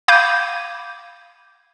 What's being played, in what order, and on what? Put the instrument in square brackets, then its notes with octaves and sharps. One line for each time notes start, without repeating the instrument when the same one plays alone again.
[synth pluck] F5 B5 D6 G6 G#6 D#7